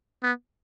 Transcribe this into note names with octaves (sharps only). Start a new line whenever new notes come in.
B3